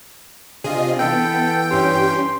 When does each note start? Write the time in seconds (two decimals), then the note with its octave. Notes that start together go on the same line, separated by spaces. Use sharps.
0.64 C3 D4 F4 G#4 D#5
0.99 E3 B3 A4 G5
1.71 G2 C#4 G4 C6